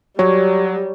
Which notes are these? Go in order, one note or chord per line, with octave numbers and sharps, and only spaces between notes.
F#3 G3 C#5